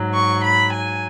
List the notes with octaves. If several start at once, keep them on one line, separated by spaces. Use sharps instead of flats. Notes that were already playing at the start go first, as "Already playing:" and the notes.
Already playing: G#2 F#3
C#6
B5
G#5